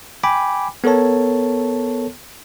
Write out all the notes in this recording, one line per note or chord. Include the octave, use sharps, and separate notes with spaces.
G5 G#5 B5 D6
B3 A4 A#4 C#5 A5